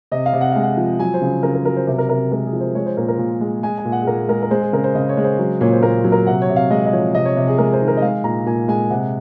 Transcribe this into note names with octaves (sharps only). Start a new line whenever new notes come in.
C3 D#5
F5
C3
F#5
G#3 F5
F#5
F3
F#3 G#5
C5
C#3
C#3 A#4
A#4
F#3 A#4
C5
C3 A#4
A#4
C3 A#4
G#3 A#4
G#4
F3
C5
G#3 C#5
C5
A#2 A#4
A#4
A#2
G#3
G#3 G#5
G#5
A#2
F#5
G#4
A#2 A#4
G#3 A#4
A#4
G#3 C5
G#4
C#3 A#4
C5
C#3 D#5
C#5
G#3
C5
F#3
A#2 C#5
C5
A#2 A#4
F#3
A#4
C3 F#5
C#5
C3
F5
G#3 D#5
D#5
F3 C#5
C3 D#5
C#5
C3
G#4
G#3 A#4
C5
D#3
A#4
D#5
G#3 F5
A#2 A#5
A#2 G#5
G#3 G#5
C3 F#5